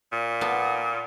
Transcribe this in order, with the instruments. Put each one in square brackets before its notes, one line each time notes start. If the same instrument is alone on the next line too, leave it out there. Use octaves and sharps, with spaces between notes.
[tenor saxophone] A#2
[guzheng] B3 A4